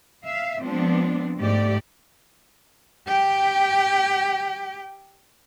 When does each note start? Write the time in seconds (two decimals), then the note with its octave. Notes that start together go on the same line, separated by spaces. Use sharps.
0.24 E5 F5
0.61 F3 G#3 B3 C4 D4
1.39 G#2 A3 G4 D5
3.08 G4 G5